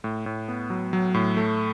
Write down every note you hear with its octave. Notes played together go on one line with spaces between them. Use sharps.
A2
A2
B3
F#3
F#3
A2
A3